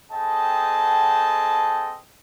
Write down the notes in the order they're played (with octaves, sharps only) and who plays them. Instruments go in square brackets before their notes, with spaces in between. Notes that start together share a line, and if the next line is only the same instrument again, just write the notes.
[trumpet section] C4 G#4 A4 D#5 G5 A5